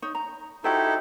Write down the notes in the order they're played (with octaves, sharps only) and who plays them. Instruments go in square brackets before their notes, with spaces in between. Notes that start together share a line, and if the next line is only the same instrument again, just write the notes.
[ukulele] D#4 C#5
A#5
[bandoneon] D#4 E4 A4 [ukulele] F#4 G4 C5